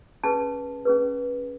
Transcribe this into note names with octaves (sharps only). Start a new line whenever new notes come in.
C#4 G#4 B4 A5
C#4 G#4 B4